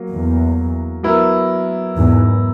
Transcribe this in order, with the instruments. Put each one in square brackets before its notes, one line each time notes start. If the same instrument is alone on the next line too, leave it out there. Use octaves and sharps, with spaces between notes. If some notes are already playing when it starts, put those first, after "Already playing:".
Already playing: [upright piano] F#3 A#3
[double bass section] E2
[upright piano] F#3 B3 E4 A#4
[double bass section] E2 G#2